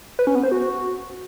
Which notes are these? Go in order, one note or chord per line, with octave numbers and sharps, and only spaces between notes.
B4
C#4
B3
C5
F#4